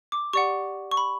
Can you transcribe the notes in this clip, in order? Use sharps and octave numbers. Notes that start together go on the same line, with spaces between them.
D6
G4 D5 F#5 C#6
C#6
B5